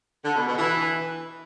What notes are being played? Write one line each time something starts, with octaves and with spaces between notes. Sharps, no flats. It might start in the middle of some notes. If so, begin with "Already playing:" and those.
D3
B2
B2
E3